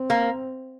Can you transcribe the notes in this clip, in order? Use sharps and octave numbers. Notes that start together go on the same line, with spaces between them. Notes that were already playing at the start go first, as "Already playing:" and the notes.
Already playing: C4
A#3